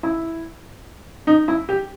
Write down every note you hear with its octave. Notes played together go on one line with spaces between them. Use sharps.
E4
D#4
E4
G4